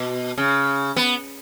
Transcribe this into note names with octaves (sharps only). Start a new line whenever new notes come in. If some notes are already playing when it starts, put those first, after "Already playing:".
Already playing: B2
C#3
B3